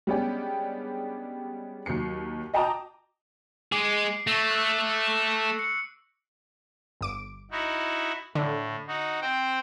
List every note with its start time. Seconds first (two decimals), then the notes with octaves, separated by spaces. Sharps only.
0.07 G3 G#3 B3 C#4 D4 G4
1.86 D#2 F#3 C7 C#7
2.54 D#5 G5 A5 A#5 D6 D#6
3.72 G#3 G#4 D6 C7 D7
4.27 A3 C#6 E6 A#6
4.49 E6 F#6 F#7
5.59 C#7
7.01 G1 D6 D7
7.51 D#4 E4 F#4
8.35 A2 D3
8.88 D#4 F#4
9.21 C4 C5 G5